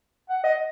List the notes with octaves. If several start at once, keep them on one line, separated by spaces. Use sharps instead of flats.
F#5
D#5